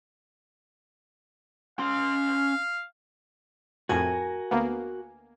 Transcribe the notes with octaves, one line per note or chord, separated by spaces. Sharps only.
C#4 F5 C6
F2 A2 F#4 A#4 G#5
D2 A#3 B3